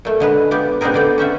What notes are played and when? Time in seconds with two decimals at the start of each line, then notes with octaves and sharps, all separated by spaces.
0.05 A#2 A3
0.20 D3 G#3 B4
0.51 B3 F4 G4 D5
0.81 B3 C4 D4 D#4 G#4 A#4
0.94 D3 D5 G5
1.18 C#4 C5 E5 F#5